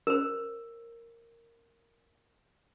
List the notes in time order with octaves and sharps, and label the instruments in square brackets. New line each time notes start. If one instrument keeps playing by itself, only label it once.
[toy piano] A#4 C5